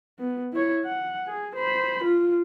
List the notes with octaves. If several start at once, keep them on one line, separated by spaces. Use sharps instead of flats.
B3
E4 C#5
F#5
G#4
C5 B5
F4